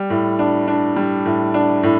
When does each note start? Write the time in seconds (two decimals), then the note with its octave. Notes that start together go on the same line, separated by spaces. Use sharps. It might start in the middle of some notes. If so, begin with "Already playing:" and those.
Already playing: G3
0.10 A2
0.39 D4
0.68 D4
0.96 G3
1.26 A2
1.54 D4
1.83 A2